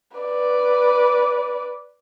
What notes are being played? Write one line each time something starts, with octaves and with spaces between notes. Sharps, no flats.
B4 D5